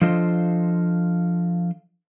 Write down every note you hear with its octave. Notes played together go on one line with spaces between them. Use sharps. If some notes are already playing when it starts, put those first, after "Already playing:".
F3 D4 F4 A4 C5 D#5